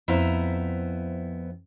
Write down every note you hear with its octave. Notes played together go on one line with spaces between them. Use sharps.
F2 B3 E4 C5 E5 A#5